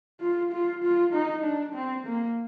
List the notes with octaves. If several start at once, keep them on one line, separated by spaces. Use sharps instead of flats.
F4
F4
F4
D#4
D4
C4
A#3